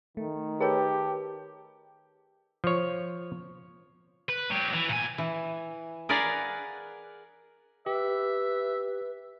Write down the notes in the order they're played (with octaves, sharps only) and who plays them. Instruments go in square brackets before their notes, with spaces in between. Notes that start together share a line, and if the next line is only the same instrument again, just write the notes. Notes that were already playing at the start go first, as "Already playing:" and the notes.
[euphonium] D#3 [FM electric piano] A3
[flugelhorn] G4 [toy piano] G#4 A#4 C#5 [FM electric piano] B4 A5
[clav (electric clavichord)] F3 C#5
[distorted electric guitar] B4
F#3 G4
E3
A#2 G#5
[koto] E3
G#4 A#4 B4 D5 F5 F#5
[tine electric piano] G4 [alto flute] B4 [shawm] E5